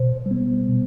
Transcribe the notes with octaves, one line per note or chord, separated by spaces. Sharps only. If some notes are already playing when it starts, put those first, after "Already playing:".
Already playing: B2 C5
G3
B3
B2